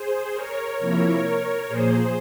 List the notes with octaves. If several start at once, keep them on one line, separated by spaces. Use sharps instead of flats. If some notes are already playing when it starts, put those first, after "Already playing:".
Already playing: G#4 C5
A#4 C#5
C3 F3 A#3 E4 A#4 C#5
A#2 F3 A#3 G#4 C5